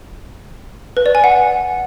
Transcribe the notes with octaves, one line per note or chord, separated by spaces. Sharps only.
B4
D5
G#5
F#5